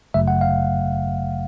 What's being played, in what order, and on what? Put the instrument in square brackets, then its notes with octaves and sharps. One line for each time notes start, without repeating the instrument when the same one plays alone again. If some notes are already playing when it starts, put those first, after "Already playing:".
[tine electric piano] G1 F#2 C#3 F#3 A3 E5
F#5
F5